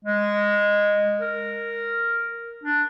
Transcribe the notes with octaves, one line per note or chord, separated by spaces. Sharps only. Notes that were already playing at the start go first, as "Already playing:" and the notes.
G#3
A#4
D4